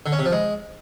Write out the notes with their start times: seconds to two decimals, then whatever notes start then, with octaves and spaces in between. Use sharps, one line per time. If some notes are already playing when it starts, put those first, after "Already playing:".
0.06 D3
0.12 C#4
0.19 C3
0.25 F3
0.32 G#3